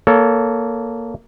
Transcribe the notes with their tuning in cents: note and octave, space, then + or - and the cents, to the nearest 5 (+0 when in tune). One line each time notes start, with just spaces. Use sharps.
A#3 +0 A4 +0 C#5 +30